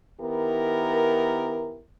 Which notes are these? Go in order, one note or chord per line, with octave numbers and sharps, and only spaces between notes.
D#3 B3 E4 G4 A#4